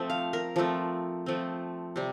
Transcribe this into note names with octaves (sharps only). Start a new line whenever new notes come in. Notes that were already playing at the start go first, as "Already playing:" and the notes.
Already playing: F3 A3 C4
F5
A#4
F3 A3 C4
F3 A3 C4
C3 G3